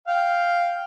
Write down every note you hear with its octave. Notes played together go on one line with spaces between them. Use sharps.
F5 G5